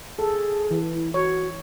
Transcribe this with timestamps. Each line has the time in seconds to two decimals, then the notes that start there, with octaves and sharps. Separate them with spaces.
0.19 G#4 A4
0.71 E3
0.93 E4
1.14 F#4 C#5